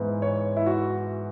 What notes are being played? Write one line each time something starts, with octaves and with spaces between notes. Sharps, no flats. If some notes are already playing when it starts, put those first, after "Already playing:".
Already playing: G#2 E3 B3
C#5
E4
F#4